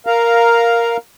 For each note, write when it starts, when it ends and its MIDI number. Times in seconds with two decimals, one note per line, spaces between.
0.06 0.97 70
0.06 0.97 77
0.06 0.97 82